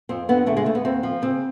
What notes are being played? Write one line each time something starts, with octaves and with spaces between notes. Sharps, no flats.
F2 C4
D3 B3
C#3 A3
G#3
D#2 A3
B3
D#2 C4
F3
C#3 C4